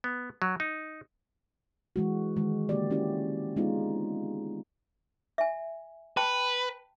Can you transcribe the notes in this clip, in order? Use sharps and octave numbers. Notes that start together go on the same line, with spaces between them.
B3
F#3
D#4
E3 G#3 F#4
D#3 G#3
D3 A#3 F#4 G4 D5
C#4 E4 F#4 G4 D5
G#3 B3 C4 D#4 F4 G#4
E5 G#5
B4 G5 A5